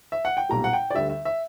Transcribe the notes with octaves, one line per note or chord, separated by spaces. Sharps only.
E5
F#5
G5
B1 A#2 G3 A#5
F#5
G5
D5
D2 D3 G3 E5
E5
E5